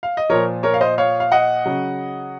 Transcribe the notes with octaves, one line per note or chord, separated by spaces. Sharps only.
F5
D#5
A#2 F3 A#4 C#5
A#4 C#5
F5
C5 D#5
C#5 F5
F5
D#5 F#5
C#3 F#3